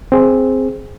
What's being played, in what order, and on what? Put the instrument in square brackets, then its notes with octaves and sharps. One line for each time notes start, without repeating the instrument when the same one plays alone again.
[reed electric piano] C4 G#4